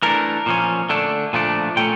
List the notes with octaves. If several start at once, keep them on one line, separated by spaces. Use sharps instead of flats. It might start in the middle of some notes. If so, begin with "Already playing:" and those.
E3 A3 D4 A#4
A#2 F3 C#4
D3 A3 D4
A#2 F3 A3 D4
A#2 A3 C#4 G5